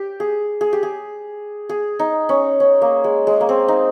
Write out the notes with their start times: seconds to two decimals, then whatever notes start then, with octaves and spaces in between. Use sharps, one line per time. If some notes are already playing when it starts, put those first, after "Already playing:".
Already playing: G4
0.20 G#4
0.61 G#4
0.73 G4
0.83 G#4
1.69 G#4
1.99 D#4
2.29 C#4
2.60 C#4
2.82 A#3
3.04 G#3
3.27 G#3
3.41 A#3
3.49 C4
3.68 D#4